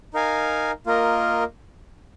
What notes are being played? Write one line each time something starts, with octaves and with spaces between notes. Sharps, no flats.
D#4 A#4 F5 G#5
A#3 F4 A#4 D#5